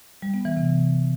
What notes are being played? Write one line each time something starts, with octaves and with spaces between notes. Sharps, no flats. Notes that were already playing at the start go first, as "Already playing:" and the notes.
G3
B3
E3
C3